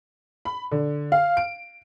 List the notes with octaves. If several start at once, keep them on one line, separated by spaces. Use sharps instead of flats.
B5
D3
F5
D7